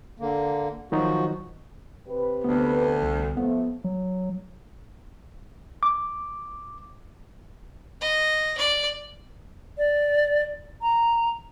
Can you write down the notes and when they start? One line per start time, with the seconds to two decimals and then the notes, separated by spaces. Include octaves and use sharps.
0.20 D3 A#3
0.92 D#3 F3 F#3 D#4 F#4
2.08 C3 G4 B4
2.44 D2 B3
3.02 C2
3.37 F3 G#3 A3 B3
3.84 F#3
5.83 D6
8.01 D#5
8.57 D5
9.78 D5
10.82 A#5